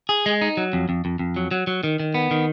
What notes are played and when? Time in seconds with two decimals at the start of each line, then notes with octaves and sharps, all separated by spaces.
0.09 G#4
0.26 G#3
0.42 D#4
0.57 F#3
0.73 F2
0.89 F2
1.05 F2
1.19 F2
1.36 F#3
1.51 F#3
1.67 F#3
1.84 D#3
2.00 D#3
2.14 B3
2.31 D#3